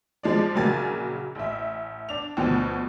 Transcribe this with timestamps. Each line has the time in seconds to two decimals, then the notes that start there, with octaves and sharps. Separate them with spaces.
0.23 F3 G#3 D5
0.54 A#1 C#3 F#3 A#3 G#5 A6
1.35 A1 E5
2.09 D4 F7
2.37 D2 B2 F3